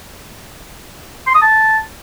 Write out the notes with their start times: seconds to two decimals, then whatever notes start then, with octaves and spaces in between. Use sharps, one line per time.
1.27 C6
1.34 D#6
1.42 A5